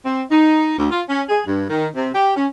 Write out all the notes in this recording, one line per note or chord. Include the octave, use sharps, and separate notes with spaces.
C4
D#4
D2
F4
C#4
G#4
G2
D#3
C3
G4
C#4